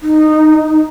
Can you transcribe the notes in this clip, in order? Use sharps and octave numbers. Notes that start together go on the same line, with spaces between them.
D#4